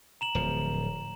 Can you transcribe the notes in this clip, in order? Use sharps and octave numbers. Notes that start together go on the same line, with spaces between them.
A#5 E7 F#7
D1 F3